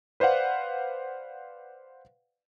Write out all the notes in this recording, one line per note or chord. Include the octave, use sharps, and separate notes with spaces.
B4 C5 D5 F5 F#5